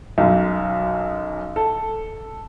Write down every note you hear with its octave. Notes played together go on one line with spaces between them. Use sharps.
B1 F#2
A4